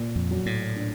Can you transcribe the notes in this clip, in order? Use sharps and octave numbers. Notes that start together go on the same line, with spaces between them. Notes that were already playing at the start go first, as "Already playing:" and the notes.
Already playing: A#2
F2
F#3
A2
D4